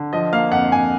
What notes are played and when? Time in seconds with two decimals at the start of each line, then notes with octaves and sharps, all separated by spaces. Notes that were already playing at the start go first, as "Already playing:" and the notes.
Already playing: D3
0.13 F3 D#5
0.33 A#3 F5
0.51 F2 F#5
0.72 F2 G#5